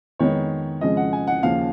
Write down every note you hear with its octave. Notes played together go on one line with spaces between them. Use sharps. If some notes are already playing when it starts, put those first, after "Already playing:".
F2 D#3 G#3 B3 D#4 C#5
F2 C#3 F3 G#3 D#5
F#5
G#5
F#5
D#2 C#3 F3 F5